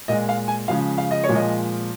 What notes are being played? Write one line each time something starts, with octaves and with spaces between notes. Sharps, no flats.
A#2 G#3 D#5
F5
G#5
C#3 F3 G#3 F5
F5
D#5
C#5
A#2 F3 G#3
D#5